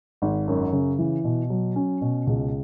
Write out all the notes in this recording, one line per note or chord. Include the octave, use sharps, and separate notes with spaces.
G#1
F#2
C#3
E3
B2
F#3
C#4
B2
C#2